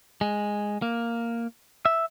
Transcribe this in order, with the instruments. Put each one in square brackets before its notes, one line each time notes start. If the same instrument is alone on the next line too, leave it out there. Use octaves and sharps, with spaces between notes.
[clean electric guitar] G#3
A#3
E5